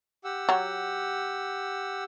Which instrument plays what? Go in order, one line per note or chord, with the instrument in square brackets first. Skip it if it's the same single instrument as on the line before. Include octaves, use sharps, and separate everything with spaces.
[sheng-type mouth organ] G4 F#5 E6
[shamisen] F#3